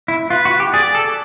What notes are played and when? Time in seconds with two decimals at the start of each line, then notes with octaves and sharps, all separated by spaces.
0.08 E4
0.30 F4 B4
0.45 F#4
0.60 G4
0.73 G#4 D5
0.95 A4